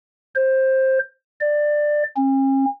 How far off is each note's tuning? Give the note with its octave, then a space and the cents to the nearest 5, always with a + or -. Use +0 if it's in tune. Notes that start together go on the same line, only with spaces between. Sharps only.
C5 +15
D5 +15
C#4 -45